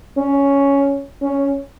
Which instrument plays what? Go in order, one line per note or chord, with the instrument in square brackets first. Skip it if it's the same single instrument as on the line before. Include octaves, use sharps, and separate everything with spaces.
[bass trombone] C#4
C#4